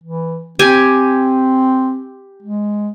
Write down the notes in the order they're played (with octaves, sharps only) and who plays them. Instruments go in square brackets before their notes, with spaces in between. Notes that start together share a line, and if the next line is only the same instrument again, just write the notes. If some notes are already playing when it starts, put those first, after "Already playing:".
[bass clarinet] E3
[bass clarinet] C4 [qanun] G4 G#5
[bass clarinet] G#3